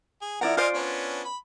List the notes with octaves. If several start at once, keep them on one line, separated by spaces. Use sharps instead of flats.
G#4
F3 E4 A#4 D5 F#5
F4 C5 D5 D#5 F5 G#5
B3 C#4 D4
B5